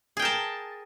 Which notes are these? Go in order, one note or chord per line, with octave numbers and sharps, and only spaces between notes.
G#4 A#4 G5 A5